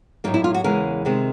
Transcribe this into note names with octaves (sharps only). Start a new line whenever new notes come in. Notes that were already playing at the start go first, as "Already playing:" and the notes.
A2 F#3 A#3 D#4
E4
F4
F#4
E2 C#3 E3 G#3 A#4
C3 D#3 G#3 C4